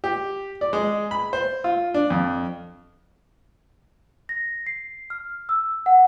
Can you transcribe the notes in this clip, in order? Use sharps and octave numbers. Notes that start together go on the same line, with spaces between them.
G4
D5
G#3
B5
C5
F4
D4
F2
A#6
C7
F6
E6
F#5